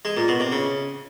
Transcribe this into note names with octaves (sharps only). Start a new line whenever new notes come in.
G#3
A#2
B2
C3
C#3